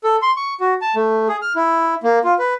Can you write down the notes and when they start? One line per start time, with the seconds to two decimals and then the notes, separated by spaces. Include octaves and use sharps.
0.04 A4
0.22 C6
0.37 C#6
0.60 F#4
0.82 A5
0.96 A3
1.29 G#4
1.42 F6
1.56 E4
2.03 A#3
2.24 F4
2.39 B4